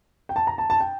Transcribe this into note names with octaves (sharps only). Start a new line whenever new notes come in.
G5
A5
A#5
A5
A5
G5